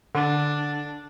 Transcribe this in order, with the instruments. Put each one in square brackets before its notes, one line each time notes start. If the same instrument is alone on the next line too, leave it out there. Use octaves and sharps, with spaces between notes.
[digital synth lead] D3 [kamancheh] D4